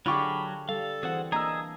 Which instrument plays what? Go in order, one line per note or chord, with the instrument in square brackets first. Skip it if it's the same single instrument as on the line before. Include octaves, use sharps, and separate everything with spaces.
[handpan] D3 D4 [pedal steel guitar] F#3 C#6 [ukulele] F4 G4 G#4 [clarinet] B5
[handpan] G3 [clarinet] A4 [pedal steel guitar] F5
[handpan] E3 C4 [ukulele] F#4 [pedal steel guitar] G#4 C5 F#5
[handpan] A#3 D4 [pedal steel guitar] G#4 E6 [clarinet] D#5 [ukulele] A#5